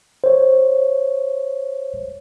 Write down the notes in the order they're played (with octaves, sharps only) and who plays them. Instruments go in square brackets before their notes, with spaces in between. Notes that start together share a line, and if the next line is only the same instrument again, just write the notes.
[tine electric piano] C5 C#5